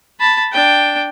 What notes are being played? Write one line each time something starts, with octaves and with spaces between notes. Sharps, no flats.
A5 B5
D4 G5